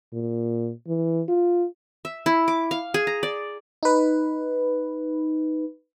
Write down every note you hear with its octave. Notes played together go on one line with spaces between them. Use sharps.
A#2
E3
F4
E5
E4
D6
F5
G#4
A#5
D5
D#4 B4